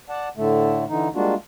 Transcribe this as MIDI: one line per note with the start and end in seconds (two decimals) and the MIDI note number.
0.09 0.29 74
0.09 0.29 78
0.09 0.29 81
0.37 0.85 45
0.37 0.85 50
0.37 0.85 57
0.89 1.08 50
0.89 1.08 52
0.89 1.08 63
1.15 1.34 55
1.15 1.34 56
1.15 1.34 58
1.15 1.34 62
1.15 1.34 65
1.15 1.34 66